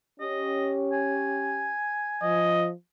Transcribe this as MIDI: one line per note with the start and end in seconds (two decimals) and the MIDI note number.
0.20 1.74 61
0.20 1.74 67
0.20 0.72 75
0.92 2.54 80
2.22 2.71 53
2.22 2.69 75